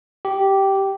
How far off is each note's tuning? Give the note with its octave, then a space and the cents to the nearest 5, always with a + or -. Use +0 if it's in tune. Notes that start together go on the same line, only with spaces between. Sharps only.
G4 -10